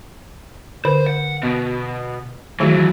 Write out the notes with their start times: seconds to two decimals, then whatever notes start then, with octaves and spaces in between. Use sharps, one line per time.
0.85 D3 B4 C5
1.07 F#5
1.43 B2
2.60 D#3 E3 F#3 A3 G#4